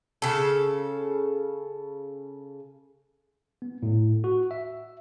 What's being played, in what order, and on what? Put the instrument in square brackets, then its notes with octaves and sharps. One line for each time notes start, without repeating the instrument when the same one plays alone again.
[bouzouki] C#3 A4
[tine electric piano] B3
A2
F#4
E5